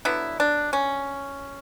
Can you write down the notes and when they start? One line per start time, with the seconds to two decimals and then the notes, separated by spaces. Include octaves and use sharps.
0.05 D3 F#3 B3 E4
0.40 D4
0.73 C#4